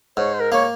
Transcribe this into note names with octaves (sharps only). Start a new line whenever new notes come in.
G#2 C#5
C5
A#4
A#3 C#5